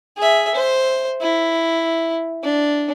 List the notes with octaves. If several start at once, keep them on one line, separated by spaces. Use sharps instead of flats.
G#4 E5
C5
E4
D4